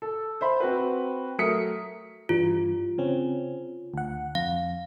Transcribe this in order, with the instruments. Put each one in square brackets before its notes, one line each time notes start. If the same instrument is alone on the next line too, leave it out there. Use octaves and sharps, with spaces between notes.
[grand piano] A4
C5 E5 B5 C6
C4 F#4 B4
F#3 A3 A#4 D#6 B6 C#7
[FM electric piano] G2 E3 G3 [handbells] F4
[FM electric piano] C#3 C4 C#4
D2 F#5
[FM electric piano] F2 [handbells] F5